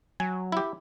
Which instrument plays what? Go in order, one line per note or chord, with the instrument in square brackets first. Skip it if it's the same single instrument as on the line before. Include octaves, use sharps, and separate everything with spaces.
[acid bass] F#3 [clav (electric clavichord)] G#5
[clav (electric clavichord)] E4 G4